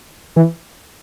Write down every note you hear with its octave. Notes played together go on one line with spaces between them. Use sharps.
E3